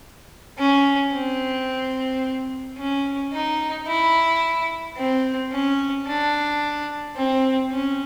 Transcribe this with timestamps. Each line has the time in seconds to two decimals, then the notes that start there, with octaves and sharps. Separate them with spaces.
0.58 C#4
1.13 C4
2.78 C#4
3.32 D#4
3.87 E4
4.97 C4
5.52 C#4
6.07 D4
7.16 C4
7.71 C#4